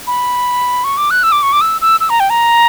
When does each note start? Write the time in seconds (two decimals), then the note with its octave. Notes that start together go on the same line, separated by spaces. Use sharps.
0.07 B5
0.84 C#6
0.97 D6
1.11 F#6
1.23 E6
1.32 D6
1.43 C#6
1.53 D6
1.61 E6
1.81 E6
2.00 E6
2.10 A#5
2.20 G5
2.30 A#5